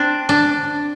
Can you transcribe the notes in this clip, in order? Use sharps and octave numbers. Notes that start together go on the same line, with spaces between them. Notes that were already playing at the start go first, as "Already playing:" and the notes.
Already playing: C4 D4
D4